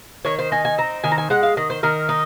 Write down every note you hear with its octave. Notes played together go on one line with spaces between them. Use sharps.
D#3 C#5
C5
D#4 G#5
G#5
C4 A#5
D#3 G#5
A#5
G#5
G#3 F#5
F5
D#3 D#5
C5
D#3 A#4
D#4